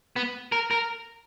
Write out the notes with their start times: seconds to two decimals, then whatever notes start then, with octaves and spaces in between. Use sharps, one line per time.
0.16 B3
0.52 A#4
0.71 A#4